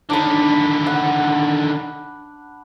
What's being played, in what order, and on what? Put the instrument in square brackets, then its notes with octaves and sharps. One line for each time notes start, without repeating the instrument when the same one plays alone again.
[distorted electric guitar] D3 D#3 [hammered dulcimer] D4 B5
[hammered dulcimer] F#5